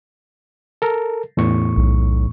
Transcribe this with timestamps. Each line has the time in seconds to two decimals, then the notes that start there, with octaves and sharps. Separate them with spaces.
0.82 A4 A#4
1.37 E2 A2 C#6
1.77 B1